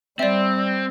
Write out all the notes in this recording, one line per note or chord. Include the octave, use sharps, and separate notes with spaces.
G3 C4 D5 E5